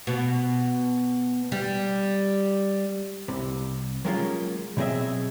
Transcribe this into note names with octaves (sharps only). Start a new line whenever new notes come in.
B2
G3
C2 C3
F#3 G#3 A#3 B3 C#4 F4
B2 F#3 C4 G#4 D#5 E5